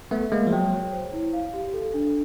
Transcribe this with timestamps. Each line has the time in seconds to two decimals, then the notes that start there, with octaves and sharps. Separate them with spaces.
0.11 A3 B3 E5
0.32 G#3 A#3 G#4
0.47 F3
0.52 F#3 G5
0.73 C#5
0.93 C5
1.13 E4
1.33 F5
1.54 G4
1.74 A4
1.94 D4